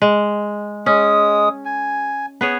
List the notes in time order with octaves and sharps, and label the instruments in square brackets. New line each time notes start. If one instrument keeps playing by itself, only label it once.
[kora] G#3
[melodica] G#3 D#6 [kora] C#4
[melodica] G#5
[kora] B3 G#4 C#5